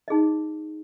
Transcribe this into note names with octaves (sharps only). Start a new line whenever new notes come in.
D#4 G#4 D#5